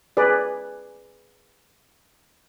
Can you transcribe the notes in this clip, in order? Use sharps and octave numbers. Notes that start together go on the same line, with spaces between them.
G#4 B4 D5